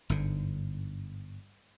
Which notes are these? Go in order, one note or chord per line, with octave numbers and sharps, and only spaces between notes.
G1 G#2 D3